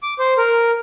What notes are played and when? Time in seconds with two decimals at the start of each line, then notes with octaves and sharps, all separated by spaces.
0.03 D6
0.19 C5
0.38 A#4